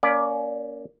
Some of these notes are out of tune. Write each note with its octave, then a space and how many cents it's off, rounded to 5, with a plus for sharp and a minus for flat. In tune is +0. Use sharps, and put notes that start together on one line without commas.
A#3 +0 C#4 +25 D5 +0